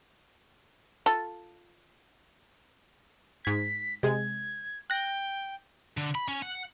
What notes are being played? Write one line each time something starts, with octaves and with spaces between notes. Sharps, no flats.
F4 A4
G#2 G#6 B6
C3 G#3 G#6
G5 F#6 A#6
D3
B5
C#4
F#5